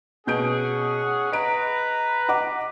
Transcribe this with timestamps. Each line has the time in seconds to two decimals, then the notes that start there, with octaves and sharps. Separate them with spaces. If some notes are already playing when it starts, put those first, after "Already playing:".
0.27 B2 C#4 G#4 F#5 G6 D7
1.32 B4 D#5 A#5 D7
2.28 D#5 F#5 D6